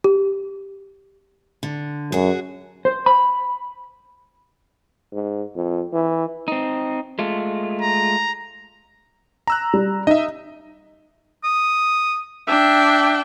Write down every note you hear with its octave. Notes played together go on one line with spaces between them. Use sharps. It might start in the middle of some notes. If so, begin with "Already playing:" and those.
G4
D3
F#2 F#4 G#4
C5
B5
G#2
F2
E3
C4 D#4
G#3 A3 F4
A#5
A#5 E6 F#6
G3
D#4 D#5 E5
D#6
D4 E5 G5